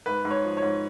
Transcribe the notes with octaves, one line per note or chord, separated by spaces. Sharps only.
G#2 B4
G#2
C#5
F3
C#5
G#2